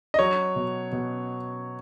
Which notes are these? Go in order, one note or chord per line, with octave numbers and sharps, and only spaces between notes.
D#5
F#3 C#5
B2
B2